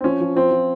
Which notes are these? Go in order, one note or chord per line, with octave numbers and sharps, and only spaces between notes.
C4
F3 C#4
F3
F3 C4
F3